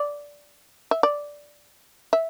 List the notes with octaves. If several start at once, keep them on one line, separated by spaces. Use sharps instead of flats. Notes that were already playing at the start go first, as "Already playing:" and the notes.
Already playing: D5
E5
D5
E5